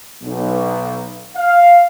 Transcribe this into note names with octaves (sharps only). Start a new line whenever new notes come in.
B1
F5